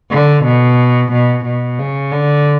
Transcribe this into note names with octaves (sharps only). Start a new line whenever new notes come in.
D3
B2
B2
B2
C#3
D3